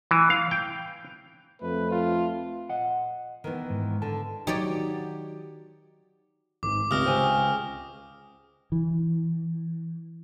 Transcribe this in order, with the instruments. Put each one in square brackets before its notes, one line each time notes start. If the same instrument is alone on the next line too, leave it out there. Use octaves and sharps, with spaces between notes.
[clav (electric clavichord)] E3
F5
G5
[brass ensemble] F2 A3 [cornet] B4
[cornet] F4
[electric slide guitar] D#5 F#5
[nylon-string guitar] D#3 E3 B3
[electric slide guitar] G#2
[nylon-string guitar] D3 [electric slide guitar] A5
[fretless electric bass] D#3 F#3 [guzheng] D#4 C#5 D5 [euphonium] F#4 [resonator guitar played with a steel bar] G4
[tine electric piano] G#1 G#2 [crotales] D6
[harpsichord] C#2 [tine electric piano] C3 [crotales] D#6 F6 A#6
[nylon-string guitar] C5 G#5 [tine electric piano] G5 E6
[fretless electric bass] E3